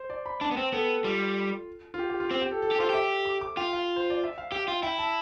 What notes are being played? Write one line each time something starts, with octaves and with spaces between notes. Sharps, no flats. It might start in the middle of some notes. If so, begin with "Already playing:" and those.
Already playing: C5
D5
B5
D4 A5
B3
C4 G5
B3 A4
G3 F4
F4
G4
G4
F4
C4 G4
G4
A4
A4
G4
F4 C5
G4 E5
D6
D6
F4 G5
F5
C5
D5
E5
F5
G4 G5
F4 F5
E4 G5
A5